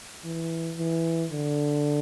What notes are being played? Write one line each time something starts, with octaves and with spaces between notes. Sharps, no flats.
E3
E3
D3